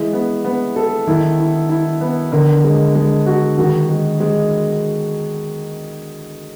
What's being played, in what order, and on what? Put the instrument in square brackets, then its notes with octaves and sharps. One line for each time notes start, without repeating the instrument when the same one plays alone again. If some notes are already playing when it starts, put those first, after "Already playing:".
Already playing: [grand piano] E3 [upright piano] G#3
[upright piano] B3
B3
A4
[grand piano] D#3 [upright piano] E4
[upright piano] E4
E4
B3
[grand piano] D3 [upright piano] A#4
[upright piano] G#3
G#3
F#4
[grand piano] D#3 [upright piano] F#4
[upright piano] G#3
G#3